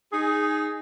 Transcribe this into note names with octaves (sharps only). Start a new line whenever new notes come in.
D#4 G#4